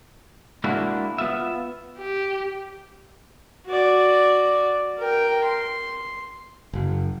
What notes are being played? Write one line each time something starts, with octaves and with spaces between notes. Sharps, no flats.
G#3 A#3 D4 E4 F#4
B3 F4 E5
G4
F#4 D5
A#4 G5
C6
F#1